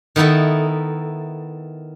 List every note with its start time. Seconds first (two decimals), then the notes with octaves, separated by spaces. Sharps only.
0.16 D#3 B3 D#4 E4 A4